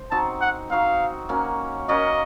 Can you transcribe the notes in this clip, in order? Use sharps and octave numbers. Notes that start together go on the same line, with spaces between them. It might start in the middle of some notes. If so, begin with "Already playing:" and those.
Already playing: C5
C4 D#4 F#4 A5
F#5
C4 D#4 F#4 F5
A#3 C#4 F#4
A#3 C#4 F#4 D#5